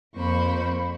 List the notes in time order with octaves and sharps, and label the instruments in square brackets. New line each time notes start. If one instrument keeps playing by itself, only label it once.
[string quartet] F2 A#3 C5 B5 C#6